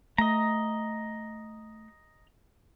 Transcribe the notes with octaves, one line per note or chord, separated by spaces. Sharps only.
A3 D#5 A#5